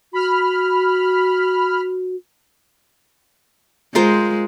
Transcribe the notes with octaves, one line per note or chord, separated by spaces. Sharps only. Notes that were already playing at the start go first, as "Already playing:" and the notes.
F#4 B5 F6
G#3 F4 A#4 C5